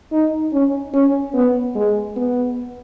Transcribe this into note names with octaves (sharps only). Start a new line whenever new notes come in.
D#4
C#4
C#4
B3
G#3
B3